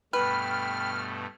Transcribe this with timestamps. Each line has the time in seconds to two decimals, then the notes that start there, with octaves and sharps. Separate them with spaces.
0.13 G2 B2 A3 B4 G5 B5 F6